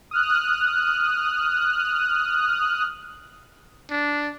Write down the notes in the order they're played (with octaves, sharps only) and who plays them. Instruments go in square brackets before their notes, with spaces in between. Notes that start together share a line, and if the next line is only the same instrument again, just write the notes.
[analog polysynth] D#6 F6 F#6
[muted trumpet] D4